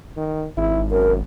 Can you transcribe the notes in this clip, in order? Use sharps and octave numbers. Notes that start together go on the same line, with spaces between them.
D#3
G#1 E4
F#2 A#4